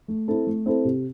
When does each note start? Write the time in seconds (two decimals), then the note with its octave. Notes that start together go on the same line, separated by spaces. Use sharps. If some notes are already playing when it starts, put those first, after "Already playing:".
0.08 A3
0.28 C4 E4 A4
0.47 A3
0.66 C4 E4 A4
0.85 C3